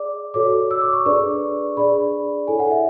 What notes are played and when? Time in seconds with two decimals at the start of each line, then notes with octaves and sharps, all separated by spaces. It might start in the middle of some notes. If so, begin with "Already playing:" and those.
Already playing: G#4 D5 D6
0.34 F#4 A4 C#5 D6
0.71 E6
0.81 D6
0.93 C#6
1.06 D4 G#4 B4 D5 C#6
1.77 D4 G#4 D5 B5
2.47 E4 A4 C#5 G#5
2.59 F#5
2.71 E5